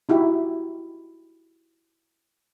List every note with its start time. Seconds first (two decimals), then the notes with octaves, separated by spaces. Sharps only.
0.09 D#4 E4 F#4 G4